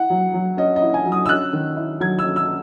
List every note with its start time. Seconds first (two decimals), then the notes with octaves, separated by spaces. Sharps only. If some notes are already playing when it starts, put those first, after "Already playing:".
Already playing: E4 F#5
0.10 F#3
0.34 F#3
0.57 C#4 D#5
0.76 D#5
0.82 E4
0.94 G#5
1.06 F#3
1.12 D#6
1.26 E6
1.29 C#4 F#6
1.53 D#3
1.76 E4
2.00 F#3 G#6
2.19 E6
2.24 C#4
2.36 E6